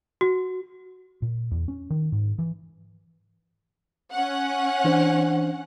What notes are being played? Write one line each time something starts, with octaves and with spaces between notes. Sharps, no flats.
F#4
A#2
E2
C#4
D#3
G#2
E3
C#4 F#5
E3 D4 C5